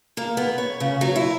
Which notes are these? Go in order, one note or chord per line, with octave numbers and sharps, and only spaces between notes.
A#3
B3
C#5
C#3
F#3
E4